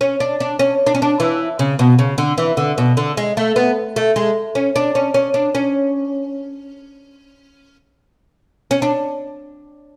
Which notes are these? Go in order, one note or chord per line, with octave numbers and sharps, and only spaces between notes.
C#4
D4
D4
C#4
D4
C#4
D4
E3
C#3
B2
C#3
D3
E3
D3
B2
D3
G#3
A3
B3
A3
G#3
C#4
D4
C#4
C#4
D4
C#4
C#4
D4